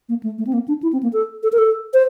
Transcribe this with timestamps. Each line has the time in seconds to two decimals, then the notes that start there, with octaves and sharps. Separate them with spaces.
0.09 A#3
0.23 A3
0.38 A3
0.47 C4
0.53 A#3
0.68 D4
0.83 E4
0.93 C4
1.03 A#3
1.13 A4
1.43 A4
1.53 A#4
1.58 A4
1.94 C5